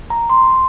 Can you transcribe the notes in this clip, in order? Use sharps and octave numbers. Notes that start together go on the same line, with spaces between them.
A#5
C6